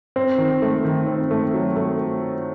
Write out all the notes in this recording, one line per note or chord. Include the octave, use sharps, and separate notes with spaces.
C4
D#3
A3
D#3
C4
A3
F#3
A3